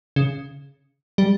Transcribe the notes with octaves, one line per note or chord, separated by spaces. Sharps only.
C#3
G3